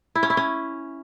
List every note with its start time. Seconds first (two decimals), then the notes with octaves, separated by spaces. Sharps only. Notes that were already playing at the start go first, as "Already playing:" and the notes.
0.15 E4
0.23 C#4
0.30 E4
0.37 C#4